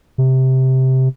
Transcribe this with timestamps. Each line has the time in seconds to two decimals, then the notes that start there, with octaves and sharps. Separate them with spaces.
0.18 C3